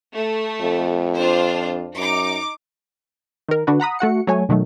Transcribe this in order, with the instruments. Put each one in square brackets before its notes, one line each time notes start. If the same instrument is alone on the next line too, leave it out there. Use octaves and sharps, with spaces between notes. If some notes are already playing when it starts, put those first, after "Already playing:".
[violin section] A3
[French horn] F2
[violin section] D4 F4 C5
[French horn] F#2 [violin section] D#4 D6
[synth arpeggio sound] D#3 A#4
D3 D4 F#4 B4
F#5 A#5 B5 D#6
A3 F#4 F#5 C#7
F#3 A3 C#5 G#5
B2 D#3 F#3 A3